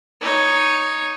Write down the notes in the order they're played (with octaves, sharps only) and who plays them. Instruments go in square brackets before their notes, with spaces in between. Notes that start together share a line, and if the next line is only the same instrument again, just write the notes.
[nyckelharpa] D#4 C#5